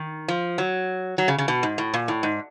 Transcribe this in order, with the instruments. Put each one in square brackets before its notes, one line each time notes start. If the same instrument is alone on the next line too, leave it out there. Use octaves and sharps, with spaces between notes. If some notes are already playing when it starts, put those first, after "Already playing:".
Already playing: [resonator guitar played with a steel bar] D#3
F3
F#3
F#3
C#3
C#3
B2
G#2
A2
A#2
A2
G#2